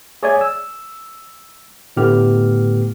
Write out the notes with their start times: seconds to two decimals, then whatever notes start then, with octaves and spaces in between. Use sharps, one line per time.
0.23 G#4 C#5 D5 E5 G#5 G#6
0.41 E6
1.97 A2 D3 A3 B3 G4 F6